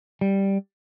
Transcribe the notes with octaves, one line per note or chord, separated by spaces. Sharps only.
G3